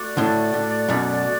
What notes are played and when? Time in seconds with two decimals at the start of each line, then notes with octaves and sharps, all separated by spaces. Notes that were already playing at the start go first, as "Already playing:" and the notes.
Already playing: A3 F#4 D5
0.17 A2 D3
0.54 A2
0.88 F#2 B2